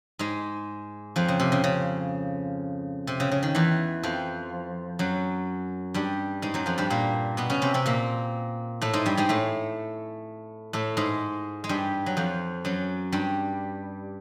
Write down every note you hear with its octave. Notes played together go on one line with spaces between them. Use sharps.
G#2 G#3
F2 F3
C#3
C3
C#3
C#3
C3
C#3
C#3
D#3
E2 E3
F2 F3
F#2 F#3
G2 G3
G#2 G#3
F#2 F#3
F2 F3
G2 G3
A#2 A#3
B2 B3
C#3 C#4
C3 C4
C3 C4
A#2 A#3
A2 A3
G#2 G#3
G2 G3
G#2 G#3
A2 A3
A2 A3
G#2 G#3
G#3
G2 G3
F#3
F2 F3
F#2 F#3
G2 G3